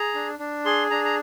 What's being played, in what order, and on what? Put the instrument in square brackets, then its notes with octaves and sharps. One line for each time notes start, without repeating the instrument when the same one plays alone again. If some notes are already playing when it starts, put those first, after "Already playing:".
Already playing: [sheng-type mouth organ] G#4 A#5
D4
D4
G#4 C6
D4 A#5
A#5